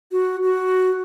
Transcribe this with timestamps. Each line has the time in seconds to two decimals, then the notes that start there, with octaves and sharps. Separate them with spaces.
0.12 F#4
0.43 F#4